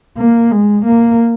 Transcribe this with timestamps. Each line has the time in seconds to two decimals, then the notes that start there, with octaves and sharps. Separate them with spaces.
0.18 A#3
0.51 G#3
0.85 A#3